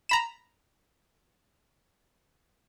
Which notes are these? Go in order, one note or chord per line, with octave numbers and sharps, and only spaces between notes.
A#5 B5 E7